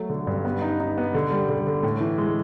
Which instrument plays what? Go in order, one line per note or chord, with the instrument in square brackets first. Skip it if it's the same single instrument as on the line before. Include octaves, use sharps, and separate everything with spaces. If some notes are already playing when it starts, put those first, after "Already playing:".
Already playing: [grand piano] F#3 A3
D3
G2
B3
D#4
D#4
B3
D3
G3
D3
D3
A2
E3
G#3